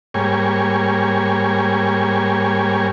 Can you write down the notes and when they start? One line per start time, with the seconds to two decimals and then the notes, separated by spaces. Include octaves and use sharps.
0.14 G#2 G3 A#3 C#5 G#5